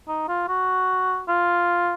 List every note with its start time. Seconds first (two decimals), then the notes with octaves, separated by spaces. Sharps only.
0.08 D#4
0.28 F4
0.48 F#4
1.28 F4